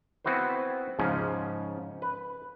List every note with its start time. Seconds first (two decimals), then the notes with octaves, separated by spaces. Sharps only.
0.25 B3 C4 E4 F#4 B4 C5
0.99 G#2 C#3 F3 C#4
2.02 B4